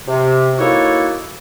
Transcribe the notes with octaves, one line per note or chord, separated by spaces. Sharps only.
C3
A#3 D#4 E4 F#4 A4 C#5